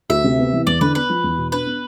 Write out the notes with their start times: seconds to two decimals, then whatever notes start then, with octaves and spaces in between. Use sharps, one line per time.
0.09 D2 E5
0.24 C3
0.39 B3
0.53 E3
0.67 E2 D5
0.81 D3 B4
0.95 B3 B4
1.09 F3
1.24 E2
1.38 B2
1.52 D4 B4
1.66 B3